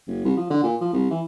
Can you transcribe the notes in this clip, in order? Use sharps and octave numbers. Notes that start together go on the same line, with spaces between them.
F#1
C2
F3
D3
A#2
F3
C2
E3